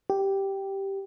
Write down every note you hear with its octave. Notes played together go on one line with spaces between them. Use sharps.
G4